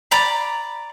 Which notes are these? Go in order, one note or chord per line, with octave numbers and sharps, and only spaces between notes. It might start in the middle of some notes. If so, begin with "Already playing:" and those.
D5 A#5 B5